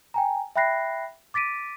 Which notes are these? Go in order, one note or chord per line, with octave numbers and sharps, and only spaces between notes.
G5 G#5 A#5
E5 G5 B5 F#6 A#6 C7
D6 A6 B6 D7 D#7